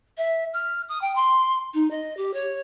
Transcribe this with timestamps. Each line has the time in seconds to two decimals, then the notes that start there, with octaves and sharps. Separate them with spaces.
0.17 E5
0.53 F6
0.89 D#6
1.01 G5
1.16 C6
1.74 D#4
1.91 D#5
2.17 G4
2.34 C#5